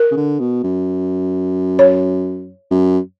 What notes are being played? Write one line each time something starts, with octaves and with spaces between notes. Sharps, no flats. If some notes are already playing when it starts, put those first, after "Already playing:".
Already playing: A#4
C#3
D3
B2
F#2
C#5
F#2